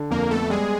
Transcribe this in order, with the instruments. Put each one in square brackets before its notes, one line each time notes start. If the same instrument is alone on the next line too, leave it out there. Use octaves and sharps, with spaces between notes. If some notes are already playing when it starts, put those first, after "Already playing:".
Already playing: [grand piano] D3
[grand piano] F2 [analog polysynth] A#3 A#4
[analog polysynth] A3 A4 [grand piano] B3
[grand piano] G3 [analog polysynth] G#3 G#4